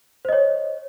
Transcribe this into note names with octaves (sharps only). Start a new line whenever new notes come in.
C5 C#5 D#5